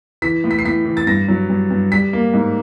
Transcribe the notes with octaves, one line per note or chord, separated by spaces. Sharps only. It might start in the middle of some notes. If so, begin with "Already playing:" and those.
E3 B6
A2
B6
C7
A2 B6
E3
A6
G2 A#6
F#3
G2
G2
G3 B6
A#3
G#2